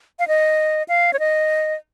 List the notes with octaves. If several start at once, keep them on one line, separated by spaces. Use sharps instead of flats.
F5
D#5
F5
C#5
D#5